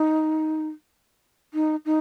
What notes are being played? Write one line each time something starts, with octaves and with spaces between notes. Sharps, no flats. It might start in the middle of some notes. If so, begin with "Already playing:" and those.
Already playing: D#4
D#4
D#4